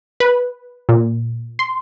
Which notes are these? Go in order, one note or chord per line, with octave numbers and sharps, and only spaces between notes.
B4
A#2
C6